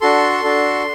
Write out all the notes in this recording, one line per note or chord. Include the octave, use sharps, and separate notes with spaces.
D4 F#4 A4 C6
D4 F#4 A4